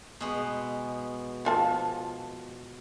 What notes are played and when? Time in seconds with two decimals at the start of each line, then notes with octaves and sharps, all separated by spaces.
0.20 B2 G#3
1.45 F3 F4 A5